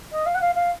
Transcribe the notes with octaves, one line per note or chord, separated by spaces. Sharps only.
D#5
F5
F#5
F5
F5